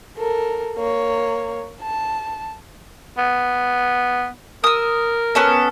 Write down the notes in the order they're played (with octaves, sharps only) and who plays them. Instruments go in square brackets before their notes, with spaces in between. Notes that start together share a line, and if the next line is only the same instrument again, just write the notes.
[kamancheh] A4 A#4
A#3 C#5
A5
[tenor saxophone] B3
[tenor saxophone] A#4 [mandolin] D#6 E6
[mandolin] B3 C#4 A4